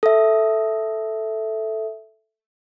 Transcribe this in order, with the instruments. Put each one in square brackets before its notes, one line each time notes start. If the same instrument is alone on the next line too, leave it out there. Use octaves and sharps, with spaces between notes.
[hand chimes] A4 E5